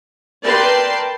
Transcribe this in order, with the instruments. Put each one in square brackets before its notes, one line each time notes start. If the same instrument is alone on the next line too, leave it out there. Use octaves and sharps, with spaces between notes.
[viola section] A#4 B4 D5 G5 A5 C6